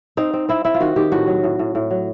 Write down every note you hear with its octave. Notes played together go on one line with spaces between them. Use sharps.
C4 D#4
C4
C4 E4
C4 E4
F4
D#3 F#4
D#3 G4
A2 F#4
F#3
A2
A2
A2
F#3